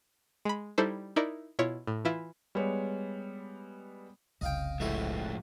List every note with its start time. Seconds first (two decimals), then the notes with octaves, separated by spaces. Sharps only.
0.45 G#3 B5
0.78 G3 D#4 E4 A4 C5
1.16 D#4 E4 A#4 D5
1.59 B2 E4 F4 C#5
1.87 A2
2.05 E3 E4 F4
2.55 G3 G#3 B3 C#5
4.41 F1 C2 C#3 D#5 F5 G5
4.80 A2 E3 F3 G#3 A3 F#4